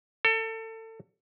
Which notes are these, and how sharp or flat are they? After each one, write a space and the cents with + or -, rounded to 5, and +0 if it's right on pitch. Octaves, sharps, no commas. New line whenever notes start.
A4 +30